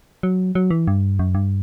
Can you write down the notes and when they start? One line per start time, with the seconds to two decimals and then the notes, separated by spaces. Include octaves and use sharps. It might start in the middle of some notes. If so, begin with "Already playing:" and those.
0.23 F#3
0.55 F#3
0.71 E3
0.87 G2
1.19 F#2
1.35 G2